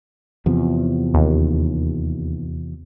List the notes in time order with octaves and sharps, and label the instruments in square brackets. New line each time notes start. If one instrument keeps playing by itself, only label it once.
[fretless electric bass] E2 C3 F3
[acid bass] D#2